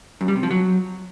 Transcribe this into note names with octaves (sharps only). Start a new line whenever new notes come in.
F#2
G3
C3
F3
F#3